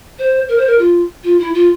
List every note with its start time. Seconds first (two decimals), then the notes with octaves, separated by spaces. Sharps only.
0.18 C5
0.48 A#4
0.57 C5
0.67 A#4
0.78 F4
1.23 F4
1.39 E4
1.54 F4